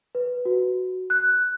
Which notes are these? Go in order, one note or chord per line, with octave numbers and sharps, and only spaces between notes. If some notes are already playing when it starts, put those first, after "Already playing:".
B4
F#4
F#6